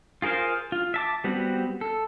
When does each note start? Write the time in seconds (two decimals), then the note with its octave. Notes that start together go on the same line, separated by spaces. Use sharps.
0.22 F4 G#4 A#4 C5 F5
0.72 F4
0.94 E5 A5 D6
1.24 G3 B3 C4 F#4
1.81 A4